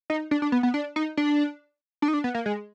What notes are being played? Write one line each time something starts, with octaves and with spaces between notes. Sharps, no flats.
D#4
D4
D4
B3
B3
D4
D#4
D4
D4
D#4
D4
B3
A#3
G#3